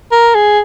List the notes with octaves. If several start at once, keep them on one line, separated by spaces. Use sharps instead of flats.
A#4
G#4